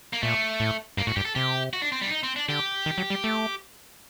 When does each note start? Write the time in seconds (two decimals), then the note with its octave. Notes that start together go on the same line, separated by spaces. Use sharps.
0.13 A#3
0.23 A#2 A3
0.60 A2
0.97 G2 A#3
1.07 A2 F#4
1.16 G2 G4
1.25 A4
1.35 C3 G4
1.73 F#4
1.82 D4
1.92 C4
2.01 G3
2.07 D4
2.11 D#4
2.23 C4
2.36 D4
2.49 D3 G4
2.86 D#3
2.98 F#3
3.10 G3
3.24 A3